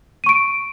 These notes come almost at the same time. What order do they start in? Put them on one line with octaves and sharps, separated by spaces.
D#7 C#6 D7